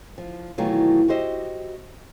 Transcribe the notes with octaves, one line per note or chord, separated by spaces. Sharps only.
F3
B2 D#3 E3 F#3 A3 F4
F#4 G4 C5 D#5 E5